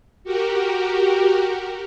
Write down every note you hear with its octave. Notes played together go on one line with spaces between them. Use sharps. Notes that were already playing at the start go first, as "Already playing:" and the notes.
F#4 G4 A#4